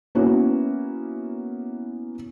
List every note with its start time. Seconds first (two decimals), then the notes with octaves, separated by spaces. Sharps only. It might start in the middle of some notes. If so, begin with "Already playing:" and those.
0.15 A#3 B3 C#4 E4 F#4